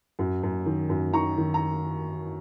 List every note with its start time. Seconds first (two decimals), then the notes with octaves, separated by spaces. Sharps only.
0.19 F#2
0.43 F#2
0.66 D#3
0.89 F#2
1.13 D#3 A#5 C#6
1.38 D#3
1.54 A#5